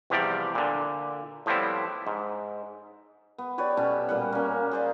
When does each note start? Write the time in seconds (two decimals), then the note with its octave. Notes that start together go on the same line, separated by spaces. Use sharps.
0.10 E2 C3 F3 G3 G4 D5
0.55 A#2 D3
1.46 A2 F3 G3 B3 C4 E4
2.07 G#2
3.38 B3
3.58 G4 B4 C#5 D5
3.77 B2 C#4 G4 A4
4.09 A#2 G3 F#5
4.33 A#3 C#4
4.71 G#4 C5 D5